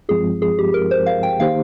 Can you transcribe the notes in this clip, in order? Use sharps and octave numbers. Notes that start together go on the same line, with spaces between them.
G2 F3 G#3 C4 F4 G#4
G#4
G4
A#4
C5
F5
G5
D#3 A#3 D#4 G4 C5 F5